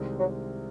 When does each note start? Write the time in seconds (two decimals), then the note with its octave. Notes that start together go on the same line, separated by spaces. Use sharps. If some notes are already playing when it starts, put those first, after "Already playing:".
Already playing: C2 C3 D#3 G#3 C4
0.19 F#3